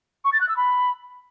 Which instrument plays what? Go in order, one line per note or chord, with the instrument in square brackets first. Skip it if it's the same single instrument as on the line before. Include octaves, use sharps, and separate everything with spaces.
[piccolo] C#6
A6
F#6
E6
B5